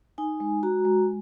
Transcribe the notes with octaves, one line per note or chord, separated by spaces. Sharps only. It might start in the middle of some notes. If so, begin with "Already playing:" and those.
D#4 G#5
G#3
F#4 A#5
G#3